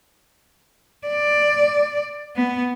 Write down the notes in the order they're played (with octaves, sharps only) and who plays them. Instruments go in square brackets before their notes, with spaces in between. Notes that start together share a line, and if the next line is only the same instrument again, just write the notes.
[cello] D5
B3